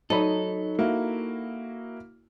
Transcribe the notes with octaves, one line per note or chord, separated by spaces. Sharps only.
F#3 D#4 A4 C#5 B5
A#3 E4 F#4